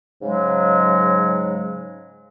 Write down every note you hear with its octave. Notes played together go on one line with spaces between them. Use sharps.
G#2 C#3 F#3 G#3